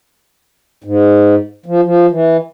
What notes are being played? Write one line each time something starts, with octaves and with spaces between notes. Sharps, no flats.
G#2
F3
F3
E3